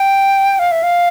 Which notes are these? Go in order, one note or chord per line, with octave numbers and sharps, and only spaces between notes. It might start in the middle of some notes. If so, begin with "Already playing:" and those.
Already playing: G5
F5
E5
F5